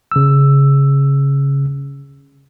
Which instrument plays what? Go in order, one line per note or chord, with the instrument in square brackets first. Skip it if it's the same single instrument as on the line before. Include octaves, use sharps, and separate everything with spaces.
[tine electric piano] C#3 E6